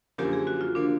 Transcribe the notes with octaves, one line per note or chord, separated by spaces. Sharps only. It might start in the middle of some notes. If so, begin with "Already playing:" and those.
F#2 D3 F3 A#3 G4
G#4
F#4
F4
D3 F3 A#3 D4